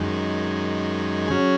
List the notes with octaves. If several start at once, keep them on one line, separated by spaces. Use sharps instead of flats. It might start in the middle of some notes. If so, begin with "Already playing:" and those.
Already playing: F#2 D#3 G#3
F#3 C#4 G#4